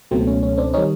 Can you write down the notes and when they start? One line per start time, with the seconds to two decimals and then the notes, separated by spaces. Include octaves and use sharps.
0.11 C#2 B2 F#3 A3 C4
0.27 C#4
0.43 C#4
0.57 C4 D4
0.73 D#3 G3 C#4 D#4